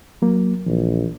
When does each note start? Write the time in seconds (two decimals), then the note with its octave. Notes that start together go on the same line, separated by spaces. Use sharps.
0.22 F#3 A#3
0.67 A#1 E3